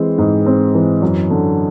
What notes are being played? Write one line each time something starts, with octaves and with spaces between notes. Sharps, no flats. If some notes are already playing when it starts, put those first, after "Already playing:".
Already playing: E3 G#3 C4
G#2
C4
E3
F#2
D3